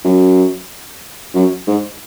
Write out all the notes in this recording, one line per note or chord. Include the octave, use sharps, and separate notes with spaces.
F#2
F#2
G#2